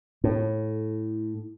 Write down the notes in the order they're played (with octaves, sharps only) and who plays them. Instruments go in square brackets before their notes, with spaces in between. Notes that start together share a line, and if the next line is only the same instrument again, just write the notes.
[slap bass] A2